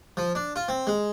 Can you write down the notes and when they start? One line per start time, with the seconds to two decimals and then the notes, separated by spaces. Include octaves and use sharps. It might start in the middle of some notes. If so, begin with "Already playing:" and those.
0.17 F3
0.35 D4
0.56 F4
0.69 C4
0.87 G#3